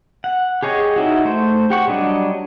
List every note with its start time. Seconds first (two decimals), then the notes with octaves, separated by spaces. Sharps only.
0.24 F#5
0.63 G4 G#4 C#5 D#5
0.96 D#4 E4 F#4
1.25 A3 C5
1.70 G4 F#5 C#6
1.87 F#3 G3 D4 D#5